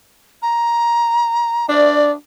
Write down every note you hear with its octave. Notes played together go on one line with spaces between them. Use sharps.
A#5
D4 D5